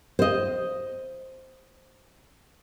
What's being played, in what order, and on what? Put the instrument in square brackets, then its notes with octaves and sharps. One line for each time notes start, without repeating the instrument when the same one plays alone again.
[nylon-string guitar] C5 D#5